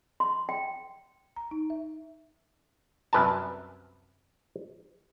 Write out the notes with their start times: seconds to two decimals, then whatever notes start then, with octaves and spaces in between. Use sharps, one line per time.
0.20 C6
0.49 G5
1.36 A#5
1.51 D#4
1.70 E5
3.13 C2 F#2 B4 G#5 A5